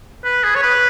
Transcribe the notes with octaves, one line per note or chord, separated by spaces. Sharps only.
B4
G#4
C#5
B4